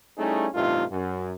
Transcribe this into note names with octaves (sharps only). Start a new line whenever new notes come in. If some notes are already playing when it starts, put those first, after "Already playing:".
G3 A3 C#4 D#4 E4 G#4
A1 G2 C3 A3 D#4 F4
F#2